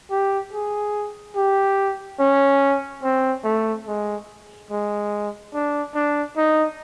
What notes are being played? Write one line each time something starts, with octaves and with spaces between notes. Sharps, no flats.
G4
G#4
G4
C#4
C4
A3
G#3
G#3
D4
D4
D#4